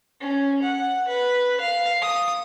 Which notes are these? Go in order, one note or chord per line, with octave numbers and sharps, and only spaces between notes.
C#4
F#5
B4
F5
D#6